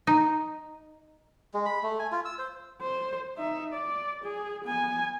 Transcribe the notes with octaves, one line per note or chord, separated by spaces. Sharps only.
D#4
G#3
B5
A3
G#5
F4
E6
C5
C5
D#4 E5
D5
G#4
B3 G#5